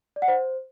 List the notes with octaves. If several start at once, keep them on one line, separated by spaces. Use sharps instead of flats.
D5
F#5
C5